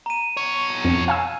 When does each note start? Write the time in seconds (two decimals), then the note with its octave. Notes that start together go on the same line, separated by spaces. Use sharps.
0.06 A#5 D#7
0.37 B2 C#5
0.84 F2
1.08 F5 G#5 E6